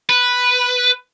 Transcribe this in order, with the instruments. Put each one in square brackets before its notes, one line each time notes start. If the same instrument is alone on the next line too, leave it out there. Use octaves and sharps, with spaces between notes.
[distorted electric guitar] B4